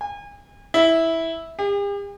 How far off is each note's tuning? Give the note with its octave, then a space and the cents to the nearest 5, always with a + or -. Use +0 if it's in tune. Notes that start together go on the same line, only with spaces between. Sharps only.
G#5 -35
E4 -10
G4 +45